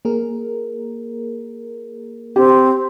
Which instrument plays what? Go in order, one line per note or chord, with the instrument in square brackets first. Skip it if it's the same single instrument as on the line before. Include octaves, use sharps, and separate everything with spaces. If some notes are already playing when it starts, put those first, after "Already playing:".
[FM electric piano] A#3 G#4 A#4
[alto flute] C4 [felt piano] G4